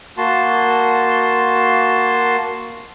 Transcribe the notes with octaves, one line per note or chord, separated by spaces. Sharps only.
A#3 F#4 A5 C6